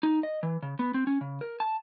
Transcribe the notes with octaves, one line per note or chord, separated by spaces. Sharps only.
D#4
D#5
E3
C#3
B3
C4
C#4
C#3
A#4
A5